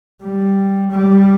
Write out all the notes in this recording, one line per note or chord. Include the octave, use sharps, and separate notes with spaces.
G3
G3